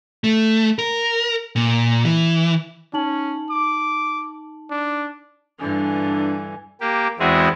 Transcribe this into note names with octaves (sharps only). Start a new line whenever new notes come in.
A3
A#4
A#2
E3
C#4 D#4 A5 F#7
D6
D4
G2 D3 E3 D4 G#5
A#3 G4
E2 G#3 C4 E4 F#4 G#4